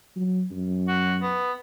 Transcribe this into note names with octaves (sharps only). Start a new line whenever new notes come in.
F#3
F#2
F#4
B3